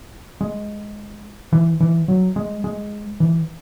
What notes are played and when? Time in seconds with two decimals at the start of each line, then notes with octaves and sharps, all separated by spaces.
0.41 G#3
1.52 E3
1.80 E3
2.08 F#3
2.36 G#3
2.64 G#3
3.20 E3